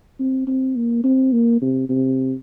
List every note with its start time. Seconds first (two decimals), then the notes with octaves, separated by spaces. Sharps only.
0.19 C4
0.47 C4
0.76 A#3
1.04 C4
1.33 A#3
1.62 C3
1.89 C3